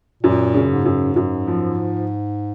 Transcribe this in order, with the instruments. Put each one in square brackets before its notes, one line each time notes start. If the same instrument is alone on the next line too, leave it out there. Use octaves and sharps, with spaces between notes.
[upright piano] F#2 [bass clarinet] A#2
[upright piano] C#3
[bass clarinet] G#2
[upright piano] F#2
F#2
F3